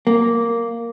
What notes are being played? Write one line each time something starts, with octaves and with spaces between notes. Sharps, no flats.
A#3